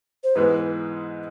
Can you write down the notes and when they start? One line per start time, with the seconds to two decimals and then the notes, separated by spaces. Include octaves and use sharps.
0.24 C5
0.35 G#2 E3 G#3 B3 B4